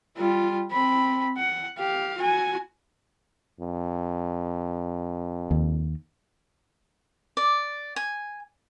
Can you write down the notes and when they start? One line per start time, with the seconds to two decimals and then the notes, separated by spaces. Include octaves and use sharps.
0.17 G3 F4
0.72 C4 B5
1.38 F#5
1.78 G4 F5
2.18 F#4 G#5
3.60 F2
5.51 D#2
7.37 D5
7.96 G#5